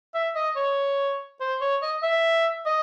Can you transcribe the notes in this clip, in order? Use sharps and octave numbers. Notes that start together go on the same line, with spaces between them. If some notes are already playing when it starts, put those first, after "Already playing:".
E5
D#5
C#5
C5
C#5
D#5
E5
D#5